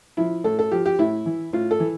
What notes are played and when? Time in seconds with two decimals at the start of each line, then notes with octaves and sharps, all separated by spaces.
0.17 F3 E4
0.44 A2 A4
0.59 A4
0.72 F3 G4
0.86 G4
0.99 A2 E4
1.26 E3
1.53 A2 F4
1.71 A4
1.80 E3